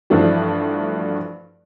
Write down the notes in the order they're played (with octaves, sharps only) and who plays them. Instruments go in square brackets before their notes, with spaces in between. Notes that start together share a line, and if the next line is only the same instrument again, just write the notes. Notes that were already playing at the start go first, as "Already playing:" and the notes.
[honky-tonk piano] G2 E3 F3 A3 D4 F#4